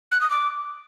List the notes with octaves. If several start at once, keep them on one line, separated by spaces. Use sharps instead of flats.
F#6
D#6
D6